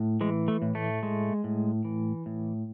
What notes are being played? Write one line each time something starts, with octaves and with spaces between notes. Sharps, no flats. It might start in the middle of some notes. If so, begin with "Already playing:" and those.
Already playing: A2
E3 G#3
A3
A2
A3
G#3
A2
E3
A2